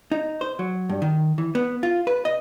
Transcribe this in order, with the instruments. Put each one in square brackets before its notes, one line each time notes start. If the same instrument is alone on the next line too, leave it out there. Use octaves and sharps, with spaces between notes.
[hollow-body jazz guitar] D#4
C5
F#3
G2
D#3
E3
B3
F4
B4
D#5